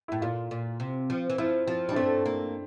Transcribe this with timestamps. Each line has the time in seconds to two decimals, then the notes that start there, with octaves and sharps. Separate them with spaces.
0.08 A2 E4
0.22 A#2 F4
0.51 A#2
0.80 C3
1.10 F3
1.30 E3
1.38 F3 E4
1.67 F3 C4
1.89 G3
1.91 D4
1.96 A3 C4
2.26 A#3